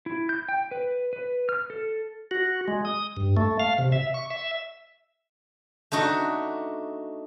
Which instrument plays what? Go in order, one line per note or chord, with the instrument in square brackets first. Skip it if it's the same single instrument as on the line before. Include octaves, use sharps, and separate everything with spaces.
[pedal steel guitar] E4
G6
G5
B4
B4
F6
A4
[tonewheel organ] F#4
G#3
D#6
G2
A3
F5
C3
E5
C#6
E5
[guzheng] A3 D4 D#4 F#4